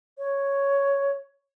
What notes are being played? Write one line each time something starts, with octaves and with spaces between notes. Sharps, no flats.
C#5